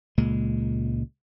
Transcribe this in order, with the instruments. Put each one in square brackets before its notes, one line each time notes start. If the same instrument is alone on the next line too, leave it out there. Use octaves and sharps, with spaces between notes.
[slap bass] C#2 A#2 G#3